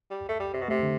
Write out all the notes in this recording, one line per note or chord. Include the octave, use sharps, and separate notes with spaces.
G3
A3
G3
C3
B2
C3 A3
D3